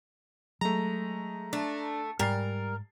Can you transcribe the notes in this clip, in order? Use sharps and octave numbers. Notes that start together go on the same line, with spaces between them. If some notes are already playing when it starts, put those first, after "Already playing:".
F#3 G#3 A3 A#5
A3 D4
G#2 G3 A#4 G#5 A6 C7